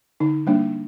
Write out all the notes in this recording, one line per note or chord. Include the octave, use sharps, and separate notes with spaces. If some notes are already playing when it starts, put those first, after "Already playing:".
D3 D#4
G3 A#3 D4